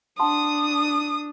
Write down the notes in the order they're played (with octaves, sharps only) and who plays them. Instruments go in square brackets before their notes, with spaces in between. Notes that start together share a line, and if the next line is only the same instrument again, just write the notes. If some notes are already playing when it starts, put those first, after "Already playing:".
[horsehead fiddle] D4 [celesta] F#5 A5 C6 [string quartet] D#6